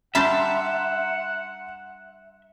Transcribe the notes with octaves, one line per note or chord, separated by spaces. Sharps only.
G3 D4 G4 E5 F#5 A#5 C6